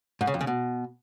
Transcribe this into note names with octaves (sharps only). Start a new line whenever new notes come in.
G#2
C#3
F2
C#3
B2